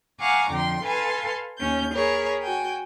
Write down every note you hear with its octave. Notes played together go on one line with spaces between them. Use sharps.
F5 F#5 G#5 A#5 C#6 D6
F2 D3 G5 C6
A4 B4 F5 G#5 A5 C6
D#2 C#4 G6
G#4 A#4 C#5 B5
F#4 G5 G#5